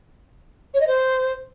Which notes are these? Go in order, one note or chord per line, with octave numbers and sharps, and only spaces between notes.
C#5
D#5
C5